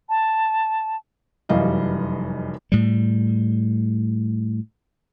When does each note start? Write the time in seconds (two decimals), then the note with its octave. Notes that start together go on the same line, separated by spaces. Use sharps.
0.09 A5
1.49 F1 F#2 E3 G3 D#5 F5
2.72 A2 G3